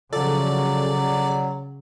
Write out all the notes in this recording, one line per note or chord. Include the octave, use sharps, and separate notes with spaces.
C#3 F3 F#3 A4 D5